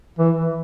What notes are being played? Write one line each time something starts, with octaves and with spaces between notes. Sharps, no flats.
E3